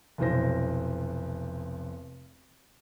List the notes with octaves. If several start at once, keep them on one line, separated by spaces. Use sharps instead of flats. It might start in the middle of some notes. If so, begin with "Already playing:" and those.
F1 B1 E3 C5 A#6